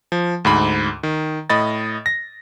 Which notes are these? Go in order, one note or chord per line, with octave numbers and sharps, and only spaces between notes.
F3
D2 G#2 B5
D#3
A2 D#5 B5 A6
A#6